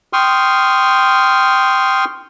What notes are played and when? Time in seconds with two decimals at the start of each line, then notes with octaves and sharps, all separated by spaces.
0.13 G5 C6 C#6 D#6 F6